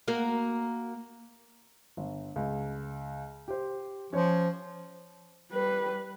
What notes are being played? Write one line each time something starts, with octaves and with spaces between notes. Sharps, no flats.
A#3 F#4 A#4
G1
C#2
G4 C5
F3 C#4 C#5
G3 B4